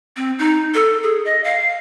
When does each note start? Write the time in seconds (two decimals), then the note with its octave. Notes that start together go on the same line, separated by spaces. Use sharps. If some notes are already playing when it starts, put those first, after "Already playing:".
0.16 C4
0.39 D#4
0.74 A4
1.03 G#4
1.25 D#5
1.44 F5